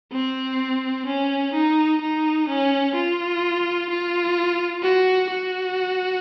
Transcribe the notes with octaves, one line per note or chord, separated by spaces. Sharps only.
C4
C#4
D#4
D#4
C#4
F4
F4
F#4
F#4